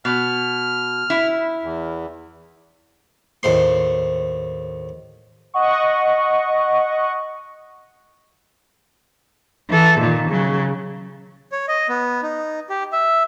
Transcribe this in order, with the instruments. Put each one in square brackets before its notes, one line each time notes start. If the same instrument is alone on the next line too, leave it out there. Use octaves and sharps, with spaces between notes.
[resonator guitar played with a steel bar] B2 [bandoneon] F6
[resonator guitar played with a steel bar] E4
[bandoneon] E2
[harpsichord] D#2 A2 C5 C6
[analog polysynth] D#5 F#5 C#6
[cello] E3 A4
A#2 D#3
C#3 F#3
[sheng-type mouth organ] C#5
D#5
B3
D#4
G4
E5